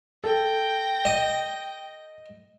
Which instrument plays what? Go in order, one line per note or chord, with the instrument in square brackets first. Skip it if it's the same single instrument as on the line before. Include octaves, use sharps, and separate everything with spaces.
[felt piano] A4 [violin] G5 A#6
[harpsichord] D#5